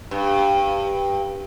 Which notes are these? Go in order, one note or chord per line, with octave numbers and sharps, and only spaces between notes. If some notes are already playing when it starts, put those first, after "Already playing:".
G2